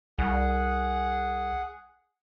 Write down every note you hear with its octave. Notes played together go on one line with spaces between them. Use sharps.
C2 G#4 F#5